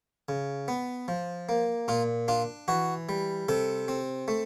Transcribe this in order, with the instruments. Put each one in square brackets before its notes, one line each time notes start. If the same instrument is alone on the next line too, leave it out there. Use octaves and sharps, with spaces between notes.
[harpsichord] C#3
B3
F3
A#3
A#2 F4
D4 F4
E3 F#4
G3
C3 A4
C4
A3